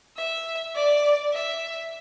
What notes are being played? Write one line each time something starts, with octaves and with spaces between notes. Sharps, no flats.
E5
D5
E5